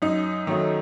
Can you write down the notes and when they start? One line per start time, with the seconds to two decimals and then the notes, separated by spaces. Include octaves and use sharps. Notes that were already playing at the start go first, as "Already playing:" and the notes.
0.02 F#2 D#4
0.47 D#3 F#3 A3